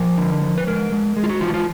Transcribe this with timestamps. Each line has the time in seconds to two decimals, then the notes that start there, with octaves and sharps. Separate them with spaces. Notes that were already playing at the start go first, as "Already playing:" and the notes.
Already playing: F3 A#4
0.18 D3
0.42 F3
0.58 B4
0.67 G#3 A#4
0.92 G#3
1.17 G#3 G#4
1.23 F4
1.29 F#4
1.41 E3 F4
1.49 F#4
1.54 F4